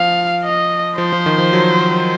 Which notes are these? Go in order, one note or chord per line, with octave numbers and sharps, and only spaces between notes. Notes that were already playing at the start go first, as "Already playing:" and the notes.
Already playing: F3 F5
D#5
F3 C5
F3
D#3
F3
F#3